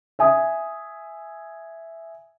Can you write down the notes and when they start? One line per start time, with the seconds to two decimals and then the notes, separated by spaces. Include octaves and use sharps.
0.19 E5 G#5 D#6